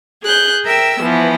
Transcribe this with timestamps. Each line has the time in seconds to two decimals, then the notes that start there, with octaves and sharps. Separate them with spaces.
0.23 G#4 F#6 G6
0.65 A#4 E5 G5 E6
1.00 E3 F3 B3